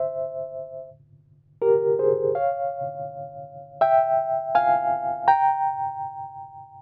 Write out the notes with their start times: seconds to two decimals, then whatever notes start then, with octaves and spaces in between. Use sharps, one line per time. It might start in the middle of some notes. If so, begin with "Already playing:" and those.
Already playing: C5 E5
1.62 G4 A#4
1.99 G#4 C5
2.35 C#5 F5
3.81 E5 G5
4.55 F5 G#5
5.28 G5 A#5